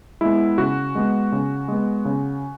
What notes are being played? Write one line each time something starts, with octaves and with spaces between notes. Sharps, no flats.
G#3 B3 E4
C#3 F#4
G#3 B3
C#3
G#3 B3
C#3